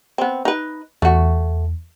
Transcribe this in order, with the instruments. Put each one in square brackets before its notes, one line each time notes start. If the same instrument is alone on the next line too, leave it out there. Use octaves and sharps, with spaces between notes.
[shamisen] B3 C4
D#4 B4
[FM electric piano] E2 [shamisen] A3 F#4